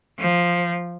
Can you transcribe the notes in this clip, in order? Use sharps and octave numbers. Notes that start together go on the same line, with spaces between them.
F3